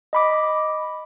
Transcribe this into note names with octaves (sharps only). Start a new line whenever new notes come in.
D#5 B5 D6